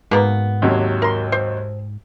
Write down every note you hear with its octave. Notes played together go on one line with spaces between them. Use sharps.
G#2 B2 A#3 B3
D#2 C3 F#3
A#4 C6
C5